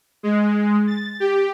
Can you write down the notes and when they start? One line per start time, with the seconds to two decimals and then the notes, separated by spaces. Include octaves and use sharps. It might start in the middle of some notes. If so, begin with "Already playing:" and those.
0.23 G#3
0.87 A6
1.20 G4